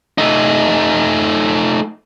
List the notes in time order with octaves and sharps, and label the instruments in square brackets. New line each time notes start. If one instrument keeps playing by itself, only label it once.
[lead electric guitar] A3 D#4